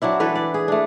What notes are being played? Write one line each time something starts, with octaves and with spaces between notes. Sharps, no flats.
F#3 C4 D4 E4
E3 A4 B4
D5
G#4
A3 D4